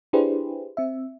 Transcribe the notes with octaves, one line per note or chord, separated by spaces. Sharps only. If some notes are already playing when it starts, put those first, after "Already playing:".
D4 E4 G4 G#4 B4 C5
C4 E5